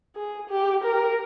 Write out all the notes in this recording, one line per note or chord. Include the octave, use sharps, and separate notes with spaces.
G#4
G4
A#4